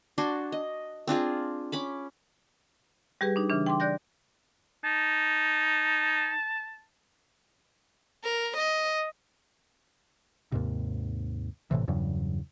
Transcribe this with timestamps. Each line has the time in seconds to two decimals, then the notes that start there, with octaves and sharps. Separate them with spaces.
0.18 D4 F#4 G#5 C6
0.52 D#5
1.07 C4 D4 F4 G#4
1.72 C#4 B5 D6
3.21 G3 G4 G#4 B4
3.36 D4 D#4
3.49 C#3 E3 D4
3.66 G5 C6 D6
3.80 D5 F#6 G6 A#6
4.84 D#4 A5
8.24 A#4
8.57 D#5
10.52 D#2 G#2 C3
11.71 G#1 A2 C3 E3
11.88 E2 G2 C#3 F#3